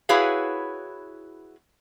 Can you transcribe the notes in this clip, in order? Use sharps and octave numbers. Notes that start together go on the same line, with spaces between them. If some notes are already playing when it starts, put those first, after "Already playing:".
E4 F#4 G#4 B4 C#5 F5